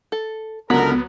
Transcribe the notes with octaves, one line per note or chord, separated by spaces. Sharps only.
A4
C#2 D3 F#3 B3 F#4 A4 A#4 B6